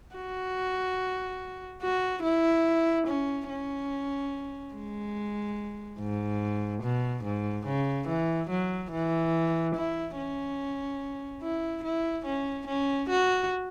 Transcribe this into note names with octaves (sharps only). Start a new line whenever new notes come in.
F#4
F#4
E4
C#4
C#4
G#3
G#2
B2
G#2
C#3
E3
F#3
E3
E4
C#4
E4
E4
C#4
C#4
F#4